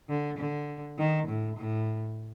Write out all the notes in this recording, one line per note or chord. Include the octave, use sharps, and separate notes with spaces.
D3
D3
D#3
A2
A2